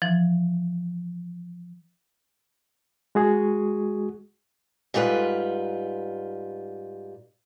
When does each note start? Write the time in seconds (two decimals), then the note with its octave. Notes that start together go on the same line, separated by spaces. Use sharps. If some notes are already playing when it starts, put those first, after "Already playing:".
0.02 E3 F3
3.15 G#3 F#4 G#4
4.94 G#2 G3 F4 G4 B4